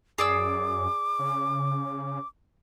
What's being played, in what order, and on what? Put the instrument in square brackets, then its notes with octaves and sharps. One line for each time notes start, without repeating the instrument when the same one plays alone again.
[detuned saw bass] F#2 [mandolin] G#4 D5 E6 [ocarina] D6
[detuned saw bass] C#3